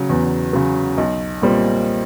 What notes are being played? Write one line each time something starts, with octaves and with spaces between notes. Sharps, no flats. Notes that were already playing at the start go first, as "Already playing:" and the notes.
Already playing: C#3 F#3
E2
C#3 F#3
B1
A#2 G3 C4